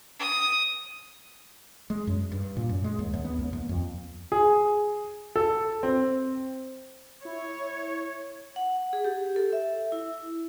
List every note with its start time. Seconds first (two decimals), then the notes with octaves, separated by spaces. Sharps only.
0.20 D#6
1.90 G#3
2.07 F#2
2.32 G2
2.57 A#2
2.69 F#2
2.84 G#3
2.99 D#2
3.14 D#2
3.25 B3
3.39 C#2
3.53 D#2
3.69 F2
4.32 G#4
5.36 A4
5.83 C4
7.25 E4 C#5
8.56 F#5
8.93 G#4
9.04 G4
9.36 A4
9.53 E5
9.92 E4